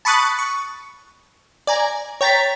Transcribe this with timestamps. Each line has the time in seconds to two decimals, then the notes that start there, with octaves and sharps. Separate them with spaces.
0.05 A5 B5 C#6 D#6 F#6 A6
0.39 C#6
1.67 D5 G#5 A#5
2.21 C#5 G5 A#5 A6 B6